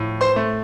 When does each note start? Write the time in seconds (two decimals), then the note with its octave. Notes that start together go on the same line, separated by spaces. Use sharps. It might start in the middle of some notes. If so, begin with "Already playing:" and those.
Already playing: A2 F3
0.21 C5 C6
0.36 A3